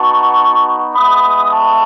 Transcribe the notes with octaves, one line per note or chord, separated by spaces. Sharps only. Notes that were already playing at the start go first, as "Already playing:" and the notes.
Already playing: B3 D#4 F#4 A5 C#6
G#3 B3 E4 B5 D#6
A5 C#6